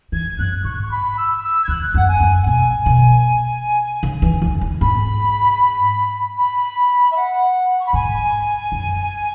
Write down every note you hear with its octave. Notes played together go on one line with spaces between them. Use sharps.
E3 G#6
F#2 F#6
G#2 C#6
C#6
B5
E6
E6
G#6
E2 F#6
F#2 F#5
G#5
F#2
F#5
B2 G#5
B2
C#3
E3
E2
E2
G#2 B5
B5
E5
F#5
C#6
B5
G#2 G#5
F#2